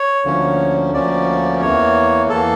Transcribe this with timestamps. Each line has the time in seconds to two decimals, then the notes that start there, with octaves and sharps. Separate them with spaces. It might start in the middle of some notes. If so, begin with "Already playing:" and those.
Already playing: C#5
0.25 D2 D3 F3 A#3 C#4
0.93 D2 D3 F3 A#3 C#4 D5
1.62 E2 E3 A#3 C#5
2.30 E2 E3 A#3 A4